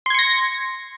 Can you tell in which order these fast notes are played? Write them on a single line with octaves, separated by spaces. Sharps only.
C6 G#6 C#7 A#6